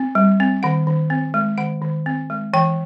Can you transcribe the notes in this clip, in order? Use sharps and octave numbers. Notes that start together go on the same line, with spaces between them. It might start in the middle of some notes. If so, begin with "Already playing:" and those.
Already playing: C4
G3
C4
D#3 F#5
D#3
C4
G#3
D#3 F#5
D#3
C4
G#3
E3 G5